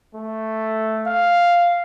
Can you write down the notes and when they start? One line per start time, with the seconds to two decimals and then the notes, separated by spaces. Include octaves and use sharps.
0.15 A3
1.07 F5